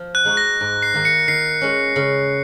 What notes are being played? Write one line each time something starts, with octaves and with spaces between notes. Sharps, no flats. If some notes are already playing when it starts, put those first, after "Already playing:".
Already playing: F3
F#6
G#3 D#4 F#4
A#6
G#2
C7
D#3 A#3
C#7
D#3 C7
G#3 C#4
C#3